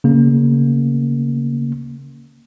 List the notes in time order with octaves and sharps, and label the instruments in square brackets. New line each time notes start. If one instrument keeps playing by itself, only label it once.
[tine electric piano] C#3 A#3